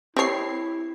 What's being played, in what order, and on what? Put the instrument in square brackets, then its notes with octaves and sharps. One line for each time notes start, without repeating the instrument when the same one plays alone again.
[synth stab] C4 C#6 C7 [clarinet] E4 [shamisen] G4 C#5